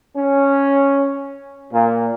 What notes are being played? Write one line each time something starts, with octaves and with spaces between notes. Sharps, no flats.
C#4
A#2